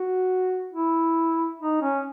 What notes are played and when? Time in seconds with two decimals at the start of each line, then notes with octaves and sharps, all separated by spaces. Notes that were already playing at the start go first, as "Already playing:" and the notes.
Already playing: F#4
0.73 E4
1.60 D#4
1.82 C#4